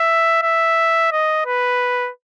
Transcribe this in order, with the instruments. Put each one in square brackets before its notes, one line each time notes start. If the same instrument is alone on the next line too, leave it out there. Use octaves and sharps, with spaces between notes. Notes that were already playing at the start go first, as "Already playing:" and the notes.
Already playing: [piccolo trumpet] E5
E5
D#5
B4